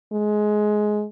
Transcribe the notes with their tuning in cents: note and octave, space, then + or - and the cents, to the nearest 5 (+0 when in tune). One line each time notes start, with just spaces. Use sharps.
G#3 +15